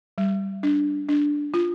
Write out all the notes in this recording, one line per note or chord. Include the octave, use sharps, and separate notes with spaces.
G3
D4
D4
F4